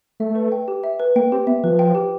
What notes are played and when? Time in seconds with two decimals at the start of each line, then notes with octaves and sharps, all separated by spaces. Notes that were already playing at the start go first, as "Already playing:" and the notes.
0.20 A3 E5
0.35 B4
0.52 G5
0.68 G4
0.83 E5
1.00 B4
1.16 A#3 G5
1.32 C4 G4
1.47 B3 E5
1.64 F3 B4
1.79 G5
1.95 G4